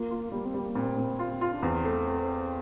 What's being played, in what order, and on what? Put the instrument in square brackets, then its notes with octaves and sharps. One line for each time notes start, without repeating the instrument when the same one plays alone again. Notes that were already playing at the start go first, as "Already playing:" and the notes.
Already playing: [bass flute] A#3 [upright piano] F4
[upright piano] F4
[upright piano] G3 [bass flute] A#3
[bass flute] C4
[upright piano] G3 [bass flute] A#3
[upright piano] A#2 [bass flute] C4
[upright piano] A#2
F4
F4
[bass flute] D4
[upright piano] E2 [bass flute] C4
[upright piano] A3